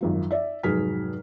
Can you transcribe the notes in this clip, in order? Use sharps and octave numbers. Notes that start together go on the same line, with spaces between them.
G#1 F#2 F3
D5 E5
F1 G#2 F#3 G#4 F6 B6